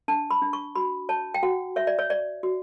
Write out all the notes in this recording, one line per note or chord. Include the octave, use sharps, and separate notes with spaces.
D4 A5
B5
D4
C#6
F#4 B5
C#5 A5
G5
F#4 F#5
C#5 E5
D5
C#5
C#5 D5
F#4